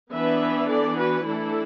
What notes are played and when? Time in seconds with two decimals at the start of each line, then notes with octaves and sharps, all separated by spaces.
0.12 E3 B3 D4 B4 E5
0.68 A4 D5
0.97 F#4 B4
1.25 E3 A3 D4 E4 A4